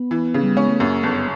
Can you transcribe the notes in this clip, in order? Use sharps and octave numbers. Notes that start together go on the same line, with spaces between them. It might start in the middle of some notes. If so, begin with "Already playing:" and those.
Already playing: B3
E3
C#3
G3
G#3 C#4
A3
F#2 A#3
G1 B3